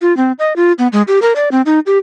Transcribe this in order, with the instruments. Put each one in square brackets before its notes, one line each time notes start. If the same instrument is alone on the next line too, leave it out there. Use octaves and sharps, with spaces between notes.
[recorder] F4
C4
D#5
F4
B3
G#3
G4
A#4
D5
C4
D#4
G4